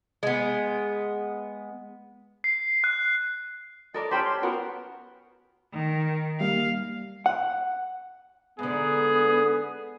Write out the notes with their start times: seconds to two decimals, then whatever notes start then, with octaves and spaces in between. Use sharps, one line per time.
0.23 G#3 B3
2.44 C7
2.84 F#6
3.94 A4 A#4 D5 D#5
4.11 C#4 G4 C5 A5 B5 C6
4.25 C6
4.43 B3 F#4 A#4
5.73 D#3
6.41 G3 A#3 F5
7.26 F#5
8.59 G#2 D3 B3 G#4